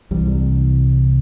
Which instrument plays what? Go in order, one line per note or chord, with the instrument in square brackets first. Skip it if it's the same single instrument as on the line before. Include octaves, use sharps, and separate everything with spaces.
[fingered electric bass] C2 C3 E3 G3